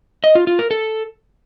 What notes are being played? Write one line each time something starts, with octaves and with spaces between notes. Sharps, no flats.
D#5
F4
F4
A#4
A4